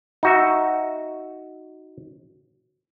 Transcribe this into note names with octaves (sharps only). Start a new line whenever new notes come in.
D#4 F#4 E5